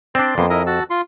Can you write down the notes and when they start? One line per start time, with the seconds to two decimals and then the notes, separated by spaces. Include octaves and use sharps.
0.15 C4 D4 D5 C6
0.38 F2 A#3 B3 C6
0.50 E4 A#4 D#5
0.67 F#4 A5 E6
0.90 F4 C6